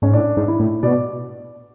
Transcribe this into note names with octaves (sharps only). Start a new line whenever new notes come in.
G#2 C#4
A2 D4
G#2
E4
A2
B2 D5